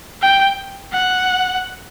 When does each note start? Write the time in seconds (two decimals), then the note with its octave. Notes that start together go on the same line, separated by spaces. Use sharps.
0.22 G5
0.92 F#5